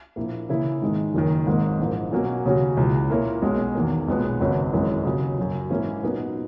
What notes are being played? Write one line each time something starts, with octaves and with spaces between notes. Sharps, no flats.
A#1 A#2 A#3 E4
C#3 E3 A#3 E4
G#2 D#3 G#3 D#4
F#1 F#2 D#3
G#1 G#2 D#3 A#3
A#1 G#2 E3 A#3
B2 F#3 A#3 C#4 F#4
D#2 C#3 F#3 C#4 F#4
C#2 C#3 E3
A#2 A#3 E4 A#4 C#5
B1 B2 G#3 C#4
E2 D#3 A#3
B1 A#2 G#3 B3
G#1 F#2 C#3 F#3
G#1 F#2 E3 G#3
D#2 C#3 F#3
F#2 C#3 F#3
G#2 E3 A#3 C#4 E4
A#2 F#3 B3 D#4 A#4